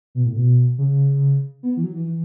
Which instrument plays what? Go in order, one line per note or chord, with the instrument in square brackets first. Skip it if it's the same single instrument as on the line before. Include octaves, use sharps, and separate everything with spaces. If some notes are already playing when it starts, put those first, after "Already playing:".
[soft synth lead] B2
A2
B2
C#3
B3
E3
F#3
E3
E3